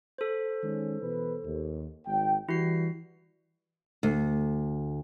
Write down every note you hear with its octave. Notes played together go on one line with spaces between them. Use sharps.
A4 C5
D#3 G#3 C#4
B2 E3 B4
D#2
G#1 G5
E3 G3 E4 F#4 C7
D2